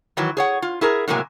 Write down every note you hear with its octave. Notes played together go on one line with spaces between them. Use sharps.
D#3 E3 F#3
G#4 C#5 F#5
F4
E4 G#4 A#4
A2 C3 F#3 G#3 A#3 G#5